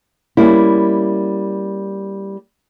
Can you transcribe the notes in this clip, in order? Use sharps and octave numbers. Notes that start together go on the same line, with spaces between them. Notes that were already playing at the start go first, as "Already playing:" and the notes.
G3 A#3 C#4 E4